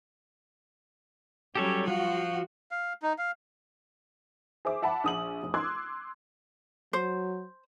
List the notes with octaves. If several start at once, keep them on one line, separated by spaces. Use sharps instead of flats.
F#3 G3 C#4 G4 A4 C#5
F3 F4 F#4
F5
D#4
F5
G#4 C5 E5 D6
E5 F#5 A5 B5
A#1 D#6 F#7
F1
C6 D6 E6 F#6 G#6
F#3 C5